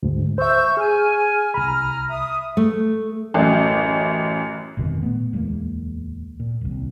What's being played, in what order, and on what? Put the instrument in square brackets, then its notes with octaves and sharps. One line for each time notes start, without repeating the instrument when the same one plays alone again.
[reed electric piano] D2 G#2
[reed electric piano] C5 E5 [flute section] C#6 E6 G6
[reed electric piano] G#4 [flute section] G#5 F6
[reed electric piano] C2 B5 [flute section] A#5 F6
[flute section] E5 D#6
[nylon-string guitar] A3
[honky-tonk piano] A1 F#2
[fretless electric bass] G1 F2 B2 D#3
A#2 A3 B3
D1 E2 G#3 A#3
A#2
D#1 C2